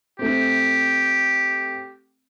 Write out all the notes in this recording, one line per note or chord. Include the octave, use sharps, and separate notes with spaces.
A3 C4 G4